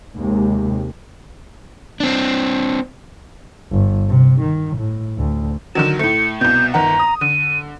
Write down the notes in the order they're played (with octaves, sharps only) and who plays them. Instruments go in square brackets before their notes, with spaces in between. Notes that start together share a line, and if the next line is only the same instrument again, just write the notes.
[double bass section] D#2 C3 G#3
[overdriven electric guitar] C4 D4
[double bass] G1
C3
D#3
A2
D2
[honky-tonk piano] D3 D#3 F#3 [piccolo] E7
[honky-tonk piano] A2 A3 [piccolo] C#7
[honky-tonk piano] C2 B2 [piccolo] G6
[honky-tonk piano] G1 D#3 F#5 [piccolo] A#5
[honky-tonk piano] D#6
[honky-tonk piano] D3 [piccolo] D#7